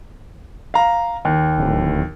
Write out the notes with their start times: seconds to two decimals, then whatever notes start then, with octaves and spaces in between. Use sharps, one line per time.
0.74 F5 A#5
1.25 D#2
1.58 D1